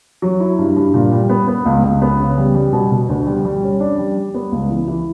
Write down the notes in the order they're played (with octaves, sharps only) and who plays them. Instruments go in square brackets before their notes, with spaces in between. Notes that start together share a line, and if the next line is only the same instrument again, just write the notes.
[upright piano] F#3
E4
G2
G2
A#2
G3
B3
B3
C#2
C#2
B3
C#3
G3
G3
B2
B2
D2
G3
G3
C#4
D4
G3
G3
B3
C#2
E3
E3